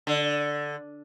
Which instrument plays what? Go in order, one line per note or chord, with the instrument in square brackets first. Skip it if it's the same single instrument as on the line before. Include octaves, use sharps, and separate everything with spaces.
[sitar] D3